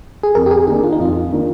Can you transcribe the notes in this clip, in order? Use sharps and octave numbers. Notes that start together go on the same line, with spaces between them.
G#4
F2 A#4
G4
G#4
D#3 A#3 D4 G#4
F4
D#4
F2 F4
D#3 A#3 D4